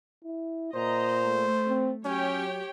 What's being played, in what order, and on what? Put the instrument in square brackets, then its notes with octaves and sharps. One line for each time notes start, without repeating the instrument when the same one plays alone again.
[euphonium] E4
[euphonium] A#2 [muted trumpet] C5 [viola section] D#5 A#5
[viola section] A3
[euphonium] C4
[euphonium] F#3 [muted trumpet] C#4 [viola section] G4 C#5 G5